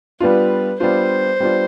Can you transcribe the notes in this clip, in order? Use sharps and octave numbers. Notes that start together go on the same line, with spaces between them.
G3 B3 D4 F4 B4
G3 B3 D4 F4 C5
G3 B3 D4 F4